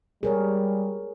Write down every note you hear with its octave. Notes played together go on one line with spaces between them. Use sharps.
G3 G#4 A#4 C#5